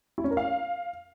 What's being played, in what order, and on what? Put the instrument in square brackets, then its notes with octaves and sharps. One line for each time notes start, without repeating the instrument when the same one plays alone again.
[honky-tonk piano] E4
C#4
A#4
F5